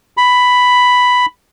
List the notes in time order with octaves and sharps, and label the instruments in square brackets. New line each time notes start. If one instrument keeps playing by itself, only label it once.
[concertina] B5